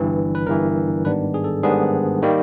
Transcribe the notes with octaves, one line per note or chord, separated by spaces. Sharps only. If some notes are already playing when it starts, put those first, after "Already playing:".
Already playing: G1 G2 E3
B4
G1 G2 E3 A#4
G#2 D#3 G3 B3 D4 B4
G#4
A4
G#2 D#3 G3 B3 D4 G#4
D#3 G3 A#3